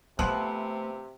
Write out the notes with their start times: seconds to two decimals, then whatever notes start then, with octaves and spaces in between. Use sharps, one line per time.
0.19 C3 F3 A3 B3 E4